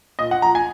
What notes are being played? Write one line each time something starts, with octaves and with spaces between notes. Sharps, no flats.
A#2 D#5
F#5
F3 A#5
G#5